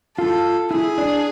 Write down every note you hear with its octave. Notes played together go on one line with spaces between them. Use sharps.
F4 A4
E4 G#4
D4